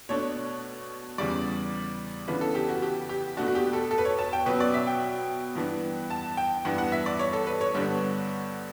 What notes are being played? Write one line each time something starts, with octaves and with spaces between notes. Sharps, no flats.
B2 A3 D4 C#5
E2 C#3 G3 D5
C#3 E3 B3 D4 B4
A4
G4
F#4
G4
G4
B2 A3 D4 F#4
F#4
G4
A4
A4
B4
C#5
A5
G5
B2 F#3 C#4 B4
D5
E5
G5
G2 E3 B3 D4
A5
G5
G2 E3 B3 D4 F#5
F#5
E5
D5
C#5
A4
B4
C#5
G2 D3 G3 B3 D4